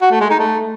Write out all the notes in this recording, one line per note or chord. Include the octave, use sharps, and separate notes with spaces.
F#4
A3
G#3
D#4
A3